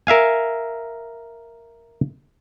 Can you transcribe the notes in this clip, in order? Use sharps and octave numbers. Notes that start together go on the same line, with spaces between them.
A#4 E5 F5 G#5